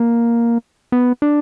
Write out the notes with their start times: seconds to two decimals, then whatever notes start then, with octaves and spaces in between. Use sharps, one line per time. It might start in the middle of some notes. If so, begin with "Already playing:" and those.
Already playing: A#3
0.92 B3
1.22 D4